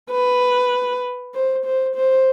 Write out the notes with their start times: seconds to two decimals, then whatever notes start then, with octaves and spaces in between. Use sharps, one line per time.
0.11 B4
1.34 C5
1.65 C5
1.96 C5